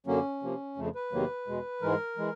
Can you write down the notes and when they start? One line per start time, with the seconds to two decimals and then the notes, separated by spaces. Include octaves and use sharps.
0.06 F#2 D3 F#3 A#3 C#4
0.42 C3 F3 A#3
0.76 F2 C#3 F3 A3
0.95 B4
1.12 E2 C3 D#3 F#3 A#3
1.47 E2 B2 G#3
1.82 G#2 E3 G#3 A#4
2.17 E3 G#3